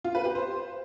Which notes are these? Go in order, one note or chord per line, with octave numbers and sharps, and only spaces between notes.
F4
B4
G4
C5